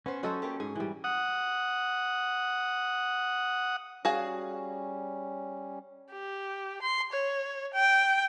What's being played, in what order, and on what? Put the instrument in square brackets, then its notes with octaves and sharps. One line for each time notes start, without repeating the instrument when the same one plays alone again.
[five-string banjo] B3 C5 [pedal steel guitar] C#4
[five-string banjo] F#3 D#5 [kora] F#4 A4 C5
[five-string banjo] A#3 G4
[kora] G#2 [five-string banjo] G#4
[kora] E3 G3
[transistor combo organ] F#5 D#6
[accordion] G3 C#4 [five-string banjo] F#4 G#4 F5
[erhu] G4
C6
C#5
G5